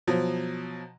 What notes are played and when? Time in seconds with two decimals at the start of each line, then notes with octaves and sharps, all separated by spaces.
0.07 B2 F3 F#3